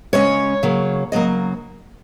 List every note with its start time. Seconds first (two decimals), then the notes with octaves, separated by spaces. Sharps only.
0.13 C#3 G#3 C#4 C#5
0.63 C#3 F#3 A#3
1.12 C#3 F#3 A#3 D#5